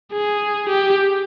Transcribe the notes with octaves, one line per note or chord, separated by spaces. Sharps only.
G#4
G4